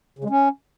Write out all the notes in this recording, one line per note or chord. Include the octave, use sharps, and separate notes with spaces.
C#3
G#3
C#4